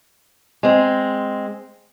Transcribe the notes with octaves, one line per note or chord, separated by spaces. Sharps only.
G#3 C4